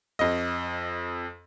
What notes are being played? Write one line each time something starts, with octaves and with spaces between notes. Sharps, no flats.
F2 D#5